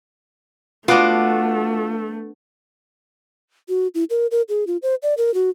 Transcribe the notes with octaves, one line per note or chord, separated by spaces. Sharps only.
A3 B3 D4 F4 F#4 F#5 D6
F#4
E4
A#4
A#4
G#4
F4
C5
D5
A#4
F#4